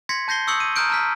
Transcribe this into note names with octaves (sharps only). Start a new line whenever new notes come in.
C6 G#6 A#6 B6 C#7
A5 G6 A#6 C7 G7
C#6 D#6 E6 G6 C#7 F#7
D#7
A#5 D#6 F6 G6 D7
A5 A#5 E6 F6 B6